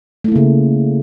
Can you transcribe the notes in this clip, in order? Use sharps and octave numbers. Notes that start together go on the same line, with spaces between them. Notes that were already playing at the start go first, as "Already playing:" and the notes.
C#3 A3 A#3 E4